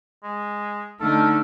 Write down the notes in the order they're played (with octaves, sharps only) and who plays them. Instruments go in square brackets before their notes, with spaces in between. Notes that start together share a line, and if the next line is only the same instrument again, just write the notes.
[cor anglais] G#3
[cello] D3 A3 [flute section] D#4 F6 [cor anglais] A4